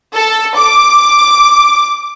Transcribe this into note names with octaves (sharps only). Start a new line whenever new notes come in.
A4
D6